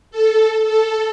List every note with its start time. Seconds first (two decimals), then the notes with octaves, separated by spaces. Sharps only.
0.11 A4
0.65 A4